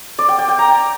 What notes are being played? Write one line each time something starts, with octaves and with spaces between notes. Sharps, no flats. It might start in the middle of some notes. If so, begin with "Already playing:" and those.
D5
G5
G5
G5
A#5